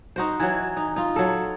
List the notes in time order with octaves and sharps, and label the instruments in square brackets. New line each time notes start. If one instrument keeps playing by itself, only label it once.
[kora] D#4 F#4 C5
E3 F#3
D#4
D#4 F4
F#3 A4